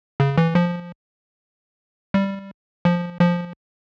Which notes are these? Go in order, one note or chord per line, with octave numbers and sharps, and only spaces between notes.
C#3
E3
F3
G3
F3
F3